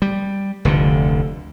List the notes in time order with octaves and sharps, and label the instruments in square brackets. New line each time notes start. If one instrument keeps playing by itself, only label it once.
[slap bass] G3
F1 D2 D3